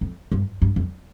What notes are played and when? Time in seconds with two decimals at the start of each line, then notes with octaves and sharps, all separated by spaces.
0.01 F2
0.32 G2
0.62 G2
0.76 F2